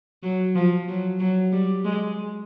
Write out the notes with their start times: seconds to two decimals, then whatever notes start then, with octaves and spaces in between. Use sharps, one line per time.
0.23 F#3
0.55 F3
0.88 F#3
1.20 F#3
1.52 G3
1.85 G#3